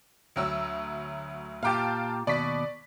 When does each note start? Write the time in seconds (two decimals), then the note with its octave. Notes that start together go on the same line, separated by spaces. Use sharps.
0.36 D2 F#3 E6
1.63 A#2 G4 F5 G5 A5
2.27 D#2 B2 D5 C#6 B6